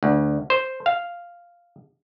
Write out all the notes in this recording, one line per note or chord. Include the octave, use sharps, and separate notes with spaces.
D2
C5
F5